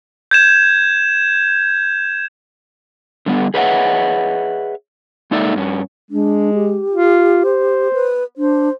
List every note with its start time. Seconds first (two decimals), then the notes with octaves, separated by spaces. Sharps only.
0.31 G6 G#6 E7
3.26 D3 G3 B3
3.54 G#4 B4 C#5 D#5 E5 F#5
5.31 G#3 A#3 D#4 A4 D5 E5
5.56 G2 C#4
6.11 G#3 D4
6.54 G4
6.92 F4
7.45 C5
7.93 B4
8.38 D4 C5